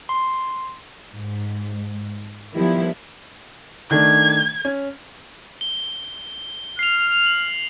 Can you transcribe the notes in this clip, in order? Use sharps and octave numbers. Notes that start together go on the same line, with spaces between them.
C6
G#2
D#3 F3 G3 B3 E4
D#3 A3 D4 G#6
C#4
G7
F6 C7 F7
F#7